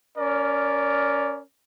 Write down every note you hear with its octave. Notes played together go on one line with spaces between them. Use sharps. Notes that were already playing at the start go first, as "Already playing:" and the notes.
C#4 A#4 D5